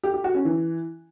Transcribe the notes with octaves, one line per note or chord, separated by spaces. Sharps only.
G4
G4
F#4
C#4
E3